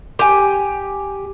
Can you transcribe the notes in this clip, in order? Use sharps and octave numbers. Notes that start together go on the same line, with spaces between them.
G4 G#5